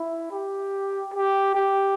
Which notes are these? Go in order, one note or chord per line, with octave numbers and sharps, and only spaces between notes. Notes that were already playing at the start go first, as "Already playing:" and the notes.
Already playing: E4
G4
G4
G4